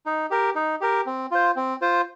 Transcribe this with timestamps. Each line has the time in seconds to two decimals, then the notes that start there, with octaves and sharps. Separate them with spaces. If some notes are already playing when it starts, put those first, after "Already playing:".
0.06 D#4
0.31 G4 A#4
0.55 D#4
0.81 G4 A#4
1.06 C4
1.31 F4 C5
1.56 C4
1.81 F4 C5